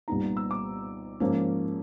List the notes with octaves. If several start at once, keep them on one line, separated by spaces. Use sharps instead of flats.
C2 A#2 G3 B3 D#4 A#5
E6
D6
G#2 F3 A#3 C#4